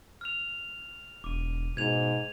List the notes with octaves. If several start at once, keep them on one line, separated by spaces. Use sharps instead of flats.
F6 F7
E1 D6 D#7
G#2 B2 G#6 F7